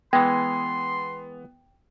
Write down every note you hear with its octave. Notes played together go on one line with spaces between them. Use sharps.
E3 G#3 B3 G5 C6